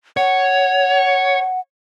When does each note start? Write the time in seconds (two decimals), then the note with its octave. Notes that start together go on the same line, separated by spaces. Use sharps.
0.17 C#5 F#5